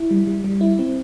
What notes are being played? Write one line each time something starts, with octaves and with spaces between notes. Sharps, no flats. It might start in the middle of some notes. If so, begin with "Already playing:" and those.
Already playing: E4
G3
G3
G3
E4
C4